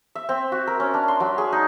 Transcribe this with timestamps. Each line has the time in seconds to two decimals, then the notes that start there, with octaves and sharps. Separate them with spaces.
0.15 E5
0.29 C4
0.52 F#4
0.67 A#4
0.80 C#4
0.94 D4
1.08 C6
1.20 F#3
1.38 G#4
1.53 D#4